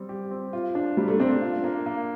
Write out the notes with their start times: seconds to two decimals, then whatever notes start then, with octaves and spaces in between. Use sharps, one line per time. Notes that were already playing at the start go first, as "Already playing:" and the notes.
Already playing: G3 C4
0.09 G4
0.31 C4
0.53 F4
0.75 D4
0.97 G3 A#3
1.08 A3
1.20 C4 D4
1.42 F4
1.64 A#3
1.86 A#3